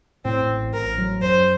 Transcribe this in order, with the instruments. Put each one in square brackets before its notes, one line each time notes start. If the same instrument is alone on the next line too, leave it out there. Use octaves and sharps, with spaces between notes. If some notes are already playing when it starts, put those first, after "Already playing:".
[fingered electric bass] A2 [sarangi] C4
[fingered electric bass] A1
[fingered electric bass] A1 [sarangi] A#4
[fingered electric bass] F#3
[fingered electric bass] F#2 [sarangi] C5